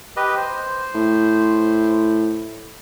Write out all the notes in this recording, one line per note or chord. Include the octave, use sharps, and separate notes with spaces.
G4 B4 D#5
C5
A2